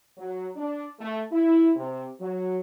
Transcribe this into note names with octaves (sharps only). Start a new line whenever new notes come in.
F#3
D4
A3
E4
C3
F#3